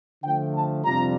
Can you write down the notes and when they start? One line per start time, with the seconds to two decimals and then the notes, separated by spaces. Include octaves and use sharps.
0.24 D3 F3 A3 G5
0.54 A5
0.84 F2 C3 G3 D4 F4 A#5